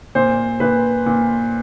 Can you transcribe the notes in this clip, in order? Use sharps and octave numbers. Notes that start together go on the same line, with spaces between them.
A#2 C5
A#2 B4
A#2